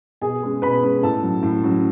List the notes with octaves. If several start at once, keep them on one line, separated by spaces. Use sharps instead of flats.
B2 G#4 G#5
G#3 C#4
B2 B4 B5
G#3 C#4
A2 A4 A5
F#3 C#4
A2
F#3 C#4